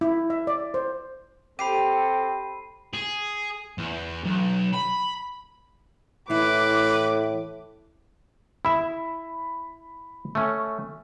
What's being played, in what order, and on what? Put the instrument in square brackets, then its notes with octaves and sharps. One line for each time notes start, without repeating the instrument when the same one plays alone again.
[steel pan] E4
E5
D5
C5
[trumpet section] C4 A4 [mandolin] G4 [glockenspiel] B5 C7 D#7
[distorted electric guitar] G#4
E2
B1
B5
[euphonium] A2 [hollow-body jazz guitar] E3 E4 [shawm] B4 [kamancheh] D6
[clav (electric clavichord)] E4 E5 [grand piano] B5
[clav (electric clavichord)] A3 C#4